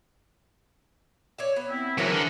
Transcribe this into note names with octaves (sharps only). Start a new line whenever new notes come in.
C#5 D5 E5
B3
C4 E4
E3 F#3 G#3 A#4 C5 E5
D3